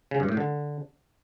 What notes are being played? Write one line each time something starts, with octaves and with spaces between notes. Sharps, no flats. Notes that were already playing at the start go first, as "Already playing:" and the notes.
C#3
G2
A2
D3